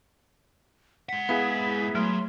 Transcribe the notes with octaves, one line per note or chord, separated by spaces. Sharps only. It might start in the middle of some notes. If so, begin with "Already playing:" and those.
G#3 F#5 B6
B3 E4 G#4 F5
F#3 A3 C6